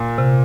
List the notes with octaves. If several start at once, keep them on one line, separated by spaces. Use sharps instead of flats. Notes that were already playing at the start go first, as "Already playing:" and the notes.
Already playing: A#2
C3